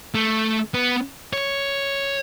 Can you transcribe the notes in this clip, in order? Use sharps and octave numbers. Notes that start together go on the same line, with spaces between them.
A3
B3
C#5